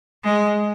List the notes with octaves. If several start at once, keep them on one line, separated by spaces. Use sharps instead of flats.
G#3